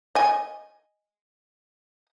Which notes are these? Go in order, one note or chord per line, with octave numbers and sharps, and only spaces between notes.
D#5 G#5